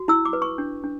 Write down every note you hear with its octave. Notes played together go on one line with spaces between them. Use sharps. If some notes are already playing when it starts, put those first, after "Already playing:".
Already playing: F#4
E4 E6
D6
B4
C#6
D4
D4